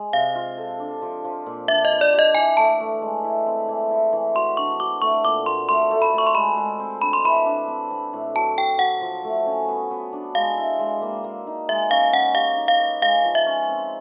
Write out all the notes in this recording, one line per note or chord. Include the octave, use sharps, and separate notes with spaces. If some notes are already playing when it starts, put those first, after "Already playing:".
Already playing: G#3 G#4
C3 F5
F4
A4
D4
F3
F3
A#2
D4 E5
D#5
B4
D5
G4
D#5
E3 G#5
A3 A5
A3
G#3
E4
C4
E3
E4
E3
F#4 C6
D4 C#6
F#4 D6
A3 C#6
A#2 D6
A#2 C6
A3 C6
A3
B5
A3
C#6
C6
G#3 B5
G#3
C4
D4 B5
C6
E3 B5
D4
C4
C4
A2
F#3 A5
F#3 G5
F#3 F#5
F3
A3
C#4
B3
B3
D4
G#3 F5
E4
G#3
A#3
A#3
D#4
G#3 E5
C#4 F5
C#4 F#5
G4 F5
D#4
F5
B4
G#3 F5
F3
E5
C#4
C4